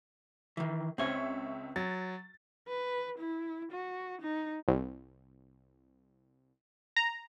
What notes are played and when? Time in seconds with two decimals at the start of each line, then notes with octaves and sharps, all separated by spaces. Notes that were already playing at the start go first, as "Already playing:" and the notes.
0.57 D#3 E3
0.98 C#2 C4 C#5 E5 C#6
1.76 F#3 A6
2.68 B4
3.19 E4
3.71 F#4
4.22 D#4
4.68 C2
6.96 A#5